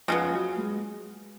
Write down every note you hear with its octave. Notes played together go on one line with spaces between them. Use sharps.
C#3 F3 G#3 B3
F#3
G#3